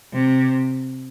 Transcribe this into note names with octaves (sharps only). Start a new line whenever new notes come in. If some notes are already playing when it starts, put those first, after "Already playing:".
C3